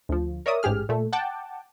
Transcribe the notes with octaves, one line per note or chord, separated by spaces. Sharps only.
D2 F3
A#4 C#5 D5 E5 D#6
A1 G#2 G4 G#4 F6
A#2 A3
F#5 G5 A5 D6